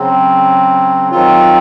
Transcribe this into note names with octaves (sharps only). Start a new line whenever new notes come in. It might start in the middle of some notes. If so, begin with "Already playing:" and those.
Already playing: C#3 F#3 C4
D#3 F#3 C4 F4